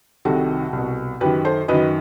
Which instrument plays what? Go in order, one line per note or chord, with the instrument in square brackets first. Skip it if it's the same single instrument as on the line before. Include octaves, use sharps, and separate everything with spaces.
[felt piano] C2 C3 D#3 F#4 A4
C2 B2
F#2 D#3 G4 B4
A4 C5
F#2 D#3 B4 D#5